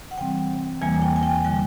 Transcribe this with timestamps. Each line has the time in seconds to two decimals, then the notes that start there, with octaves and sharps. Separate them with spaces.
0.11 F#5
0.18 C3 E3 G3 C4 G5
0.81 E2 C3 E3 G3 A#3 G#5
1.02 G5
1.16 G#5
1.23 G5
1.44 D3 G3 G5